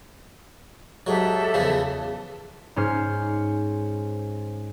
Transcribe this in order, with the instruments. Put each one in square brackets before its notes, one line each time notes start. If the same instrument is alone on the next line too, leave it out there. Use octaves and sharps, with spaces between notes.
[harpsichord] G#2 F#3 [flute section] G4 A4 E5
[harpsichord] E2 C#3 F3
[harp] G#2 C#4 C5 F6